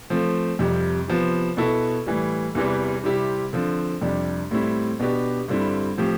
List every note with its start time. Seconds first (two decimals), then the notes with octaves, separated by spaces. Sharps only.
0.10 F3 A3 C4
0.59 F2 C3 G3
1.08 C3 F3 B3
1.57 B2 B3 E4 A4
2.06 A2 E3 G3
2.55 E2 C3 E3 G3
3.04 C3 G3 C4 E4 G4
3.53 D3 F3 C4
4.02 F2 C3 G3 D4
4.51 A2 G3 C4 E4
5.00 B2 B3 D4 G4
5.48 G2 D3 G3 C4 E4
5.98 A2 F3 C4 G4